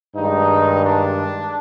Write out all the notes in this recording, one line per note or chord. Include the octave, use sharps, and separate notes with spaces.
G2 D#3 G#3 D#4
D4